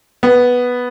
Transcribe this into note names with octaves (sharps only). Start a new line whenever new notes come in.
B3